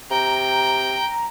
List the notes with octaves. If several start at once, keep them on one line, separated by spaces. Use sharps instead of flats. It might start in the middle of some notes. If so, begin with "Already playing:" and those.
C3 G5 A#5